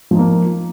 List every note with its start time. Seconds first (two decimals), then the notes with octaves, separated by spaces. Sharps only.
0.11 F3
0.15 D#4
0.19 A#3